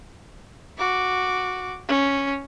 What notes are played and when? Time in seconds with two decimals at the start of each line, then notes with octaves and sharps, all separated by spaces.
0.78 F#4 D6
1.88 C#4